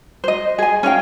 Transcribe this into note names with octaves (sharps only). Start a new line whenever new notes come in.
C5 D#5
G#4 G#5
C#4 D#4 F5 G5